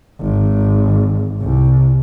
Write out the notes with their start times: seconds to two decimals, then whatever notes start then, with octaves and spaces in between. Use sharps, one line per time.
0.21 G#1
1.42 C2